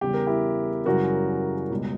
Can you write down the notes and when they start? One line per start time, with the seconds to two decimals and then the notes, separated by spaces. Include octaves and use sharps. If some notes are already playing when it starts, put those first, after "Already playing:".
0.01 E2 C#3 G3 G4
0.14 A#4
0.27 E4 G4
0.85 F#2 C#3 E3 G3 F#4 A#4
1.71 C#2 B2 G3